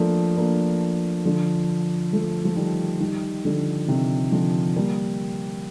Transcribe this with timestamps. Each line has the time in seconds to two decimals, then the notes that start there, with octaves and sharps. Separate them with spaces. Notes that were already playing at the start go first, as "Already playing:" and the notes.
Already playing: F3 A3 A#3 D4
0.36 A#3 D4
1.25 D3 F3
2.13 F3 A3
2.45 F3
2.56 D#3 G3
3.00 D#3 G3
3.45 D3 F3
3.88 C3 D#3
4.32 D3 F3
4.76 G3 A#3